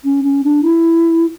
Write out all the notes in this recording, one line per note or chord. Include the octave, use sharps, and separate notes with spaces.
C#4
C#4
D4
E4